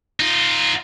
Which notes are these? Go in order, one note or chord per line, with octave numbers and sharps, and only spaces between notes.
D#4 F4